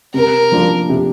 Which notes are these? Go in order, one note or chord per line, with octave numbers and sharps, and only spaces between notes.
C3 A#4
F3 A#3 D4 F4
C3